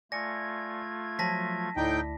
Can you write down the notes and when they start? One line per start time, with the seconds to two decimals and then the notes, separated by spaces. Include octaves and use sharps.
0.12 A3 F4 D5 G#5 G#6 A#6 C#7
1.19 F3 F#3 A5 A#6 B6
1.77 D2 A2 D#4 E4 D5 G5